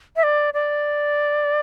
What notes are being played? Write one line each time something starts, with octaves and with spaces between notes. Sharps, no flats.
E5
D5
D5